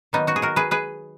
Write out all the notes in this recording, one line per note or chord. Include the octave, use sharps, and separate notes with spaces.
D#3 F#3 A#3 B3 D#4
D#4 F#4
G#4
F#4 A#4
G#4 B4
G#4 B4